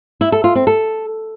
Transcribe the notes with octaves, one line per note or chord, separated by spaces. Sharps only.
E4
A4
F4
C4
A4